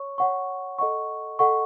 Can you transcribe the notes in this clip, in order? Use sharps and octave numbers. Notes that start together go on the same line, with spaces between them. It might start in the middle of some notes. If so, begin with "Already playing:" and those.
Already playing: C#5 C#6
C#5 F#5 C#6
A4 D#5 F#5 C#6
A4 D#5 F#5 C#6